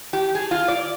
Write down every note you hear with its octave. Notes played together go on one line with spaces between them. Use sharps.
G4
G#4
F4
D5